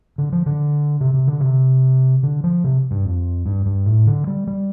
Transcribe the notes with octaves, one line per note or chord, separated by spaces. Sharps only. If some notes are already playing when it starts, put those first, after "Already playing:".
D3
F3
D3
C3
C3
D3
C3
D3
F3
C3
G2
F2
G2
G2
A2
D3
G3
G3